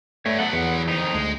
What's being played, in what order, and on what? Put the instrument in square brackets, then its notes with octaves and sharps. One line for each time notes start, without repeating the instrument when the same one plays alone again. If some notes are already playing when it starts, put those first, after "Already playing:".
[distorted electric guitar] G2 [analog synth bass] A3 [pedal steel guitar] C#5
[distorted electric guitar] F#3 B3 [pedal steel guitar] A4 F#5
[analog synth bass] E2 [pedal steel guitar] B4 F#5
[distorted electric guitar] F2 D#3 [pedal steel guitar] D#4
[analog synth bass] D2 [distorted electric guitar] G#3